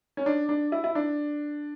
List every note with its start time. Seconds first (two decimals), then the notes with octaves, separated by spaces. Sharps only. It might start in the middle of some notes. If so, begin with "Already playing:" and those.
0.17 C#4
0.26 D4
0.49 D4
0.72 E4
0.84 E4
0.95 D4